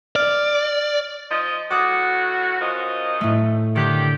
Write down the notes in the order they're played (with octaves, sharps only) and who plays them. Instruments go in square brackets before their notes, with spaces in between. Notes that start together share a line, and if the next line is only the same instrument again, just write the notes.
[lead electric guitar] D5 [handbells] F6
[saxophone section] F3 C5 D#5
[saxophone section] A2 F#4 [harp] D6 D#6 F#6
[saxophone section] F#2 F3 D#5
[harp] A2 A3
[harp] D3 F#6 G6 [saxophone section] D#3 G4